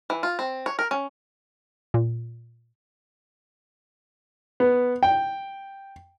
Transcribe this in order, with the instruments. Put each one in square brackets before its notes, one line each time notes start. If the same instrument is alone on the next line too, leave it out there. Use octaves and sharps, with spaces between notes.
[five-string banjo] E3
F4
C4
C#5
A#4
C#4
[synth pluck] A#2
[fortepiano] B3
G5